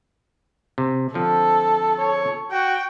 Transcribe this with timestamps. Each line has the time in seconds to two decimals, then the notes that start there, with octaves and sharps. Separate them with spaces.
0.78 C3
1.14 D3 F3 C4 A4
1.98 C#5
2.51 F#4 G5